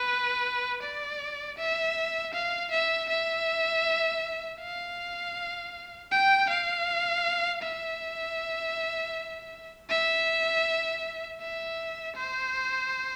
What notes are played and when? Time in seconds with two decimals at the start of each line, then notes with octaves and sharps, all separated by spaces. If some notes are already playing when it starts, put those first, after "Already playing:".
Already playing: B4
0.83 D5
1.58 E5
2.33 F5
2.71 E5
3.09 E5
4.61 F5
6.11 G5
6.50 F5
7.62 E5
9.90 E5
11.41 E5
12.16 C5